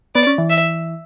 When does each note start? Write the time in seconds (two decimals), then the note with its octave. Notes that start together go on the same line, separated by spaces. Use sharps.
0.15 B3 D5
0.27 C#4
0.38 E3
0.50 E5